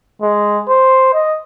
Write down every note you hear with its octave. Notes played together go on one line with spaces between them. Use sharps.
G#3
C5
D#5